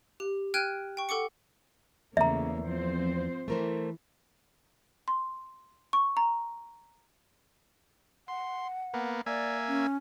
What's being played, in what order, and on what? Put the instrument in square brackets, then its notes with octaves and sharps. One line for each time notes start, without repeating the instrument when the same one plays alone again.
[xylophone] G4
G5 F6 F#6 G#6 D7 D#7
G5 C#6
A4 F#5 C#6 D6 C#7
[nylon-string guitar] E2 A3 [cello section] C#3 A#3 [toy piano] E5 A#5
[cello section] F3 C4 C5
[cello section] E3 [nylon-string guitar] A3 A#4 C5
[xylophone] C6
C#6
A#5
[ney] F#5 [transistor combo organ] C6
[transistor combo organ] A#3 B3
[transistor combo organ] A#3 E5 G#5 [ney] D5
[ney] C#4